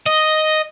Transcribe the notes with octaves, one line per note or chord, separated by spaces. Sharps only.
D#5